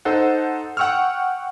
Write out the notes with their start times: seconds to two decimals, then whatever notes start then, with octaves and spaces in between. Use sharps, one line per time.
0.05 D#4 A4 C5 F#5
0.77 F#5 G5 C#6 E6 F6